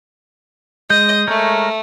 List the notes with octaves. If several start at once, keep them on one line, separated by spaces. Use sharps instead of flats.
G#3 D#5 G6
G#3 A3 A#4 C#5